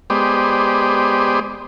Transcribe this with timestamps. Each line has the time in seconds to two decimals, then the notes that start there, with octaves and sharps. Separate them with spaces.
0.10 G#3 B3 G4 C5 D5 D#5